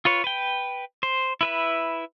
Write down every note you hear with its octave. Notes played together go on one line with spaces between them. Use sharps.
F4 B4 C#5
B4 G5
C5
E4 B4 E5